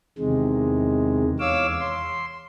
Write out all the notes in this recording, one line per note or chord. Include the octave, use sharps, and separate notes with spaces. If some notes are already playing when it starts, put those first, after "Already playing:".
E2 C3 D#3 G#3
E2 C#5 F5 D6 E6
C6